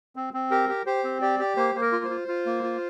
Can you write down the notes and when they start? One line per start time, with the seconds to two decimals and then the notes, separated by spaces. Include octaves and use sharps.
0.16 C4
0.34 C4
0.51 G4 A#4
0.69 G4
0.86 G4 C5
1.04 C4
1.22 G4 D5
1.39 G4
1.57 A#3 C5
1.75 A#3 C5
1.81 A#4
1.92 F4
2.05 C5
2.10 F4
2.28 F4
2.46 A#3
2.63 F4